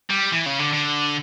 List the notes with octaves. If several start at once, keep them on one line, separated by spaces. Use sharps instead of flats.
G3
E3
C#3
D3
D3